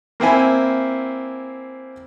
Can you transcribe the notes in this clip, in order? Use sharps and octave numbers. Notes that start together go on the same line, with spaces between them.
A#3 C4 E4 G#5